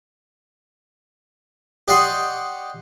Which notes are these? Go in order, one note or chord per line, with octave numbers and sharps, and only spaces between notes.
G4 D5 D#5 F#5 C6 C#6